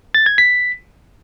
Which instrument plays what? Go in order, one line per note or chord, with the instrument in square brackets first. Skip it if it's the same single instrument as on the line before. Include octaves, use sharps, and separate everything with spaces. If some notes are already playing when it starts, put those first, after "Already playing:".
[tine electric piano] A6
G#6
B6